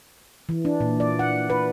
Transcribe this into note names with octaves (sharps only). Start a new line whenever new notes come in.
E3
D4
A#2
D5
F#5
B4